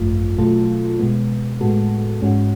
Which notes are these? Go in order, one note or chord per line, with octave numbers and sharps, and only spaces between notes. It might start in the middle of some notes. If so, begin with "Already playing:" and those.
Already playing: G#1 F#2 F3 A3 F4
B2 F#3 A3 F4 A4
B2 G#3 B3
A2 G#3 B3 F#4 A4
G#2 G#3 C#4 F#4